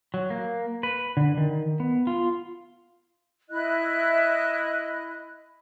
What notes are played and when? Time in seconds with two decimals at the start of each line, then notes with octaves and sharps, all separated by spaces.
0.14 F#3
0.30 A#3
0.83 B4
1.17 D3
1.37 D#3
1.80 B3
2.07 F4
3.50 E4 D#5 F#6